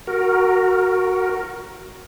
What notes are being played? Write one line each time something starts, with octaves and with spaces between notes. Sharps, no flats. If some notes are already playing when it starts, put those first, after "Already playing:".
F#4 A#4